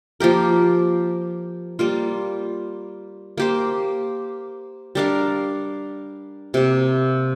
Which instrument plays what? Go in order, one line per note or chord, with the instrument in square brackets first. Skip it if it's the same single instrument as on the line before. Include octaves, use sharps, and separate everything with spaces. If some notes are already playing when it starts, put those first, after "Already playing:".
[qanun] F3 A#3 G4 A#4
G3 A#3 F4
A#3 G4 C5
G3 D4 A#4 F5
C3 A#3 G4